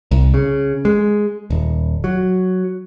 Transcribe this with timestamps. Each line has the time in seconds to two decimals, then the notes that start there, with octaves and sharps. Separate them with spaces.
0.11 C2
0.34 C#3
0.85 G#3
1.50 D#1
2.04 F#3